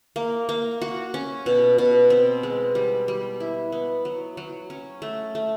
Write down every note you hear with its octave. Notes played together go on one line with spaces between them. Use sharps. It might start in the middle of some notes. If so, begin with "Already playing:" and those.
A#3
A#3
F#4
C#4
B2
B2
C4
G#3
G3
G3
E4
B3
F#3
F#3
C#4
A3
A3